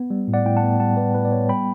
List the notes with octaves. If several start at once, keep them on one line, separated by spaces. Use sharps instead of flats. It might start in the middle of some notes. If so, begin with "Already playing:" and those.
Already playing: B3
G3
A2
D5 F#5
A2 G5
F#5 A5
B3
G3 F#5 A5
A2 B4 D5
A2 B4
D5
B3 C#5
G3 G5 B5